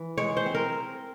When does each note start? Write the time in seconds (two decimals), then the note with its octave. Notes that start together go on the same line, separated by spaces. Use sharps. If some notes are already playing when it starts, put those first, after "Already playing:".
Already playing: E3
0.18 G#3 C#5
0.37 C5
0.46 C4
0.55 A#4